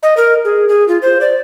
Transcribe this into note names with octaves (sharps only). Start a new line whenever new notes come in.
D#5
A#4
G#4
G#4
F4
C5
D5